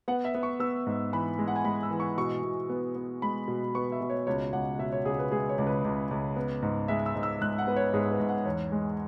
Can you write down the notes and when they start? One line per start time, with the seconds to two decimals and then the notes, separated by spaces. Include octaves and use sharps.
0.08 B3 F#5
0.25 E5
0.34 B3
0.43 C#6
0.60 B3 E6
0.86 G#2
1.13 E3 B5
1.39 G#3
1.48 F#5
1.56 G#5
1.64 G#3 B5
1.83 E6
1.91 E3
2.00 C#6
2.17 B2 C#6
2.43 B2
2.69 B3
2.95 B3
3.22 G#3 B5
3.48 B2
3.75 B3 C#6
3.92 E5
4.01 B2
4.10 C#5
4.27 C#2 C#5
4.53 C#2 F#5
4.79 B2 E5
4.93 C#5
5.05 C#2 G#4
5.19 B4
5.32 G#3 G#4
5.49 C#5
5.58 C#2
5.67 B4
5.85 C#2
6.11 C#2
6.36 B3
6.62 G#2
6.88 G#3 E5
7.06 E6
7.15 G#2
7.23 E6
7.41 G#2 F#6
7.58 F#5
7.67 B3 B4
7.76 C#5
7.93 G#2 G#4
8.12 B4
8.20 G#2
8.29 F#5
8.45 E2 C#5
8.72 G#3